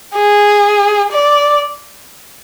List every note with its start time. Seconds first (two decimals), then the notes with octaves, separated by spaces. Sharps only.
0.15 G#4
1.12 D5